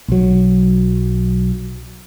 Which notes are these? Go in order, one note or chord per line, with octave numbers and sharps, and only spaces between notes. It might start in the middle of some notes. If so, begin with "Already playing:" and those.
B1 F#3